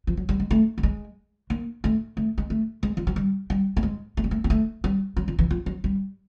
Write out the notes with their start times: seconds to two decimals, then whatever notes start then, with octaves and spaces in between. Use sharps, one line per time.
0.07 F3
0.17 F#3
0.29 G3
0.40 G#3
0.51 A3
0.78 A3
0.83 G#3
1.50 A#3
1.84 A3
2.17 A3
2.38 G#3
2.50 A3
2.83 G#3
2.97 F3
3.07 F#3
3.16 G3
3.50 G3
3.77 A3
3.83 G#3
4.17 A3
4.24 G#3
4.31 A3
4.44 A#3
4.50 A3
4.84 G3
5.17 F#3
5.28 F3
5.39 E3
5.51 F3
5.66 F#3
5.84 G3